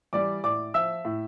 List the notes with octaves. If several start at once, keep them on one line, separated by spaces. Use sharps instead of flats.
E3 G3 D5 D6
A2 D5 D6
F3 E5 E6
A2